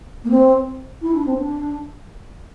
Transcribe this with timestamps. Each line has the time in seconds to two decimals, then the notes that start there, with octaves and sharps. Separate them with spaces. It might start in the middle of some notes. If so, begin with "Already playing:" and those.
0.24 A#3
0.30 C4
1.02 E4
1.14 D4
1.26 C4
1.38 D4